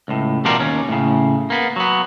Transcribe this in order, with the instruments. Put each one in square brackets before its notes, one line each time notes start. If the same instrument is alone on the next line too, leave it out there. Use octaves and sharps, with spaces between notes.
[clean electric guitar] C#2 A2
E2 B2 G3 D4 F4 A#4
D#2 C#4
A2 C#3
A#3 B3
F#3 B3